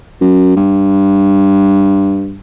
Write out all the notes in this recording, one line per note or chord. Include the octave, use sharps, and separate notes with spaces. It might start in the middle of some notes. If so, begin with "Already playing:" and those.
F#2
G2